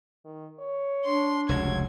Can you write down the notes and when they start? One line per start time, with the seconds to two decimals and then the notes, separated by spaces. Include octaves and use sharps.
0.25 D#3
0.59 C#5
1.05 D4 C6
1.49 F1 C#2 F#3 G#6